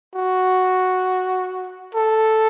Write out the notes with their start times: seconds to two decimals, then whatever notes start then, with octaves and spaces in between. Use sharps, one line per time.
0.15 F#4
1.95 A4